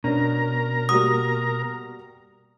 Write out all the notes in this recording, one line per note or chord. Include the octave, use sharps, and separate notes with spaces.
B2 C#4 D4 A#4 A#5
G3 A#3 F#4 D#6